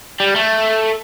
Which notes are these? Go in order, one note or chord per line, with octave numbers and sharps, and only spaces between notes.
G3
A3